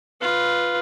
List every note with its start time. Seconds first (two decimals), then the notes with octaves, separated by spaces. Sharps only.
0.21 F4 B4